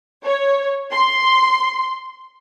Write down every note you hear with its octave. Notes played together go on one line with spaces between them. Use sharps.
C#5
C6